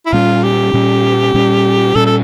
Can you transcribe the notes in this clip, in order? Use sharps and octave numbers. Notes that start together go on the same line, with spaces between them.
E4
A#2 G3 C#4 F4
G4
A#2 G3 C#4
A#2 G3 C#4
A#2 G3 C#4 A4
A4